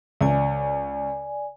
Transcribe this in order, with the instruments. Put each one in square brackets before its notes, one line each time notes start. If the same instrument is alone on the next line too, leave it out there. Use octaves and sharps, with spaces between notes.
[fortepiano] C#2 [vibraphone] D5 G#5